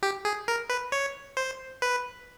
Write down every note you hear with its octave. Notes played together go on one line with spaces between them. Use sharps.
G4
G#4
A#4
B4
C#5
C5
B4